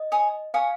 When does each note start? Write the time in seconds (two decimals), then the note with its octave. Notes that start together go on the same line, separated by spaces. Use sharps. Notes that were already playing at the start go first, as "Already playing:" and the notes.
Already playing: D#5
0.12 C#5 G#5 D#6
0.54 C#5 F5 G#5 D#6